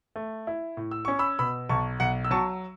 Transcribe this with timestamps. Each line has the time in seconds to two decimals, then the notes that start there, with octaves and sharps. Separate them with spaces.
0.16 A3
0.47 E4
0.77 A2
0.91 E6
1.05 C#4 C#6
1.19 B5 E6
1.39 B2 B5 E6
1.69 B1 A5 C#6
2.00 B1 F#5
2.24 E6
2.31 F#3 A5 C#6